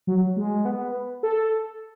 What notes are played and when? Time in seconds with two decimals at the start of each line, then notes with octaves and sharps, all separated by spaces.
0.07 F#3
0.37 G#3
0.65 B3
1.23 A4